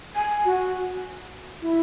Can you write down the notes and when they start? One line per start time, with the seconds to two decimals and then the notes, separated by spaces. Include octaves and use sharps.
0.15 G#5
0.45 F#4
1.62 E4